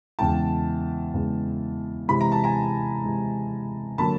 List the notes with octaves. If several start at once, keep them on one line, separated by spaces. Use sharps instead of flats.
E2 C#3 E3 G#3 G5 A5
E2 C#3 E3 G#3
C3 E3 G#3 B5
A#5
A5
G#5 A#5
C3 E3 G#3
D3 F#3 A#3 A5 B5